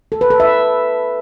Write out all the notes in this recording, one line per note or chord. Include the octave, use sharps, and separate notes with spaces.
A4
B4
A4
E5